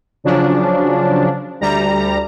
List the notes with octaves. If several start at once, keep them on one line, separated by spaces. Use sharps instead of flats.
C#3 F3 F#3 C#4 D4
D2 G3 A#5